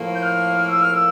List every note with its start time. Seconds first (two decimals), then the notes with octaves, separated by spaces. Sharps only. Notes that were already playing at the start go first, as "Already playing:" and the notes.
Already playing: A2 F3 A#3
0.14 G6
0.22 F6
0.68 E6
0.81 F6
0.93 E6